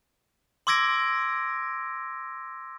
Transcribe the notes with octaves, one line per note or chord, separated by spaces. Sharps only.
C6 D6 E6 G#6 A#6 D7